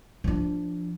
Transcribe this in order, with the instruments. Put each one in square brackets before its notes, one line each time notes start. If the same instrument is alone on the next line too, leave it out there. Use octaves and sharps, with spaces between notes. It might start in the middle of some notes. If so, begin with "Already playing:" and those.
[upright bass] F3 D4